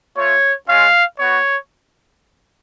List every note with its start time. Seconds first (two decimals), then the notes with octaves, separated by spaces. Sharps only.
0.16 A3 F4 C#5
0.68 G#3 C#4 F4 F5
1.19 B3 F#4 C#5